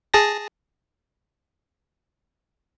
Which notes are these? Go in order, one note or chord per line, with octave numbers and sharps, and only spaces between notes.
G#4 A5 A#6